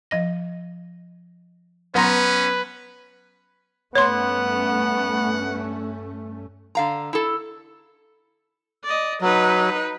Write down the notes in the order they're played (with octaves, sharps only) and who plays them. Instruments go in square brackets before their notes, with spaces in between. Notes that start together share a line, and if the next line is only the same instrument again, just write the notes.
[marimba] F3 D#5 A#6
[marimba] F#3 C6 A#6 [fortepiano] B3 A#5 [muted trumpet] C#4 [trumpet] B4
[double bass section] G2 A3 C#4 [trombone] B3 [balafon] C#5 C6 [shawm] F#5
[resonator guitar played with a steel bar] D3 F5 A#5
E4 A4
[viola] D5 D#5
[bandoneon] F#3 [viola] D#4 B4